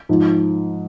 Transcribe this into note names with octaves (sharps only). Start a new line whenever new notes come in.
G#2 F3